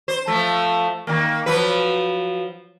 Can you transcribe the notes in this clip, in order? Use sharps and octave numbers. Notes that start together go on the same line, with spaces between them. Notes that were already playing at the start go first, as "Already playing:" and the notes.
C5
F3 A3
D#3 A#3
F3 F#3 B4